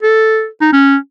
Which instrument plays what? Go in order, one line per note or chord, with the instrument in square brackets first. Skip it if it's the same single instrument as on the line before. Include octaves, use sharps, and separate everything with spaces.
[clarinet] A4
D#4
C#4